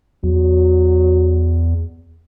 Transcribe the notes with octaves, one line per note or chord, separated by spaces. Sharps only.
E2 F#3